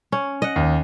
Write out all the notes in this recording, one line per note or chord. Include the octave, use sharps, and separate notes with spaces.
C#4
D#5 F#5
D#2